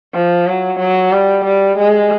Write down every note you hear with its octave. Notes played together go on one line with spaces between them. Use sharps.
F3
F#3
F#3
G3
G3
G#3